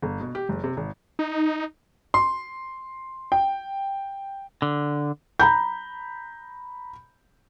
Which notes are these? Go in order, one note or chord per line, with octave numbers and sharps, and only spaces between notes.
G1
B2
G4
F#1
C3
G#1
D#4
C6
G5
D3
A#5 B5 G6